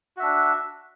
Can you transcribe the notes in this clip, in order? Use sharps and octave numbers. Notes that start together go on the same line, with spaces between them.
D4 F#4 E5